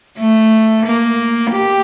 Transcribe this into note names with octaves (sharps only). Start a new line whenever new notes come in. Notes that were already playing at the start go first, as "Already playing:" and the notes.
A3
A#3
G4